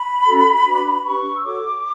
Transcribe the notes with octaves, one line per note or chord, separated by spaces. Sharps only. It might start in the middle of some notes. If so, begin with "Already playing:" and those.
Already playing: B5
C#4 F#4 A4
D4 F#4 B4
D4 G4 B4 C#6
E6
F#4 A4 C#5 D6